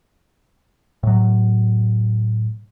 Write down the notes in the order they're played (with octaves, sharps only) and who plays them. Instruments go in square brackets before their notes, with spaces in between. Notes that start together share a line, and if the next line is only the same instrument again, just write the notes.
[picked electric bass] A2 F#3